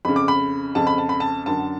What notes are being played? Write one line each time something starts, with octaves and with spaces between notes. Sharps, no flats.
F2 C#3 B5
D6
B5
F2 C#3 A5
B5
A5
B5
A5
F#2 D3 A5